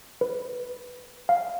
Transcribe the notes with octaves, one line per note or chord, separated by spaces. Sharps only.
B4
F5